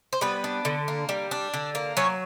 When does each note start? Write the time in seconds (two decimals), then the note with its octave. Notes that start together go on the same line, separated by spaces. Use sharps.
0.13 C5
0.21 G3 B3 B4
0.44 D4
0.65 D3
0.88 A#3
1.09 G3
1.31 D4
1.54 D3
1.75 A#3
1.97 F#3 C#4 C#5